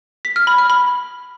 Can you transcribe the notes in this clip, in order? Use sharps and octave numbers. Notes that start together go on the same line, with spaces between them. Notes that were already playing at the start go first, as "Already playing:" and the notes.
B6
F6
B5
F6
B5